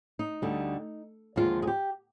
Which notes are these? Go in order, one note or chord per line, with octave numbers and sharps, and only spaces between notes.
D#4
D2 D3 G3
D#2 D3 F3 G#3 F4
G#4
G4